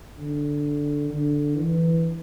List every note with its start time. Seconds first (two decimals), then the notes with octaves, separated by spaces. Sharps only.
0.18 D3
1.10 D3
1.56 E3